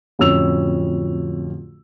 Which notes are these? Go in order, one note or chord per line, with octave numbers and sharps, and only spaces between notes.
D1 F2 F3 C#4 E6 F7